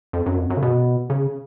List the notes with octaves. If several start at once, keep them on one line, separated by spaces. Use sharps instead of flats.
F2
F#2
F2
F#2
C#3
B2
C#3